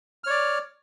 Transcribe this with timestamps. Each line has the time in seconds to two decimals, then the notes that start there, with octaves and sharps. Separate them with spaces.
0.24 F6
0.27 C#5
0.30 D5